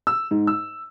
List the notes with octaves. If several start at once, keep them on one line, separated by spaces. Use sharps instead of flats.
E6
G#2
E6